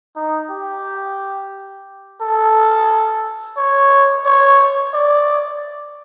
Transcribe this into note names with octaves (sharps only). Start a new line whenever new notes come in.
D#4
G4
A4
C#5
C#5
D5